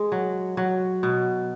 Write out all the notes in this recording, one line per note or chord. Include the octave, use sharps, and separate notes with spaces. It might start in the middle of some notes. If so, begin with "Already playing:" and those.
Already playing: G#3
F#3
F#3
B2